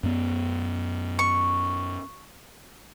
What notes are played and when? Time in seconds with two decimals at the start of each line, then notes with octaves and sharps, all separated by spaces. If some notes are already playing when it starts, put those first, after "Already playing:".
0.03 F#2 B3
1.19 C#6